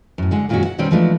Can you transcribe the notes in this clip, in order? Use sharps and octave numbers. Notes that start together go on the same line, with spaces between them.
F#2 A2
D3 G#3 F#5
F#2 A#2 D#3 G#3 C#4 F#4
F#5
B2 D#3 G3 C4 C#4
E3 F3 G#3 A3 D4 D#4